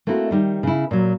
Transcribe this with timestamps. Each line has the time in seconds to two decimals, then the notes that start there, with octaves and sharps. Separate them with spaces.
0.07 A3 A#3 C4 E4 F#4
0.31 D#3 G3 D#4
0.63 C#3 E4
0.91 A#2 F#3